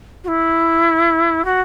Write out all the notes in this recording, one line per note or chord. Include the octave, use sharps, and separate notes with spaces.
F#4
E4
F#4